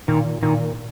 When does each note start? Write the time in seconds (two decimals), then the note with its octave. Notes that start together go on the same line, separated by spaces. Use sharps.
0.08 A#2 D#3
0.43 A#2 D#3